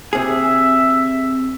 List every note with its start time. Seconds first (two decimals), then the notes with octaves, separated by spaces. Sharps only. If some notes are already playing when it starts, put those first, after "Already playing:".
0.13 C3 G#4 E5